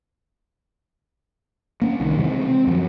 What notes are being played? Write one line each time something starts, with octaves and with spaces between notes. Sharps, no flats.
A#3 C#4
C2 D#3
C3 E3 G#3 C4
C4
F#2 F3 F#3